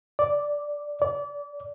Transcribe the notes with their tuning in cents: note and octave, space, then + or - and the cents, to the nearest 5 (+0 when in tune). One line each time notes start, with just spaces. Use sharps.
D5 -5
D5 -30